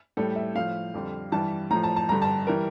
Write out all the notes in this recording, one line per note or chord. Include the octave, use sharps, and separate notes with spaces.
A2 G3 A4
E5
A2 F3 F5
F2 D3 G3
G2 E3 G3 A5
A2 F3 A#5
A5
A5
G2 D3 G3 A#5
A5
E3 G3 A#4